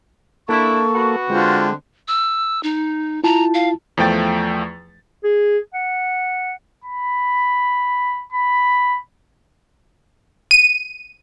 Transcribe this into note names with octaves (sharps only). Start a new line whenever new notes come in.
A#3 D4 E4 A4 C#6
B3 F#4
D3 G#3 C4 F4
E6
D#4
E4 F4 A5 A#5
F5
E2 F3 A3 G5 A6
G#4
F#5
B5
B5
D#7